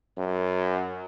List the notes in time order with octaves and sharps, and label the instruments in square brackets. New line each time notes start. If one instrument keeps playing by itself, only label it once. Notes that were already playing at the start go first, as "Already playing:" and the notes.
[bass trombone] F#2